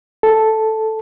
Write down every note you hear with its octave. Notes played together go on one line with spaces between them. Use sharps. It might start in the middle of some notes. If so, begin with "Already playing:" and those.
A4